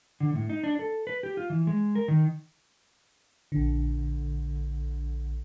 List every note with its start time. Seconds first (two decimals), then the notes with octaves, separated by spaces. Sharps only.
0.20 D3
0.35 A2
0.50 D#4
0.64 D4
0.79 A4
1.07 B4
1.23 G4
1.37 F4
1.50 E3
1.67 G#3
1.95 A#4
2.08 D#3
3.52 A#1 D3